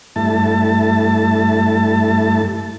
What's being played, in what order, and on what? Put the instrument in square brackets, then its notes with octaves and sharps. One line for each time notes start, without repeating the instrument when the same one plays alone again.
[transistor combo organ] G2 A3 E4 A5